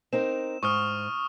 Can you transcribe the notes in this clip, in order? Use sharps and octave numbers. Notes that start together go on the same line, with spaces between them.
C4 D#4 A#4 E7
G#2 C#6 D#6 F6